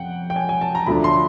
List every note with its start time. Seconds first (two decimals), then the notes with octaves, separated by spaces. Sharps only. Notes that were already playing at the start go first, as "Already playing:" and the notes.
Already playing: F2 F#5 G5
0.30 G5
0.36 G#5
0.49 G#5
0.61 A5
0.75 A#5
0.86 D2 D3 F3 A3 D4 B5
1.04 C6